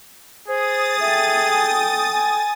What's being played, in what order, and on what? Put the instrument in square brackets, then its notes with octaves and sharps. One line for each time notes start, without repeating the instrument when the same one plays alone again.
[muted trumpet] G#4 [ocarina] C5 [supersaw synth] D#6 A6
[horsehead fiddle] A4 G5 [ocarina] E5
[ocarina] G#5
G#5